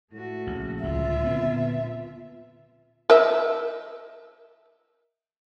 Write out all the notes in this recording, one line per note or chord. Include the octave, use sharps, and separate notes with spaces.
A2 A3 F#4
A#1 C#3
D1 C#2 F4 E5
A#2 D3 B3 C4
A#4 D#5 E5